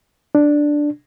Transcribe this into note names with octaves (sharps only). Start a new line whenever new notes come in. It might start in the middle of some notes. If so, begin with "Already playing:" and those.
D4